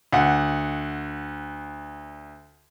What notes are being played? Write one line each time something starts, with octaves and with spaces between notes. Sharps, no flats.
D2 F#5